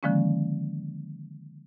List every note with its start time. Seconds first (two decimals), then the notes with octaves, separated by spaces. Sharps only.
0.03 D3 D#3 F3 G#3 A#3 C#4